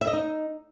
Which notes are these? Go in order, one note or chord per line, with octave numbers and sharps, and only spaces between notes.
E5
D#5
D#4